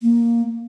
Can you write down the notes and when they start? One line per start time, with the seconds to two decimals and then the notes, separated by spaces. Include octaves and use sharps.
0.02 A#3